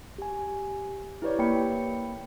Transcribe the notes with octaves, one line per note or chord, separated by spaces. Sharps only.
G4 G#5
E4 G4 B4 C#5 D5
A#3 G5 B5 C#7